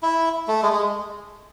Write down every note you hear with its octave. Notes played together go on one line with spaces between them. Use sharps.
E4
A3
G#3
G#3